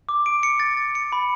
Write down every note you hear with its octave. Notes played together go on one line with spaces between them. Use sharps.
D6
D7
C#7
A6
A6
C#7
B5